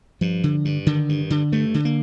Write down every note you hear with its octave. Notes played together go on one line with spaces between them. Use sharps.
G2 F3
D3
G2
D3 D#3
G2
D3
G2 A3
D3
A#3